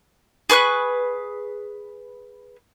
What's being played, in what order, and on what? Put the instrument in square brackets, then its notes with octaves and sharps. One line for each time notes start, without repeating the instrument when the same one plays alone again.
[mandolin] G#4 B4 C#6 F#6